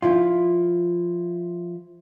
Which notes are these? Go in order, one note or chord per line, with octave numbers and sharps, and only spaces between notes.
F3 E4 F4